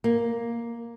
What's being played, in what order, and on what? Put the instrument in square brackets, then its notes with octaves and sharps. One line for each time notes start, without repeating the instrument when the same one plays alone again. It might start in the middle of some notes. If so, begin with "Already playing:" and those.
[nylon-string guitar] A#3